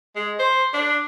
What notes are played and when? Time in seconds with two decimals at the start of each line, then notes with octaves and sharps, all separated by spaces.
0.16 G#3
0.39 C5
0.74 D4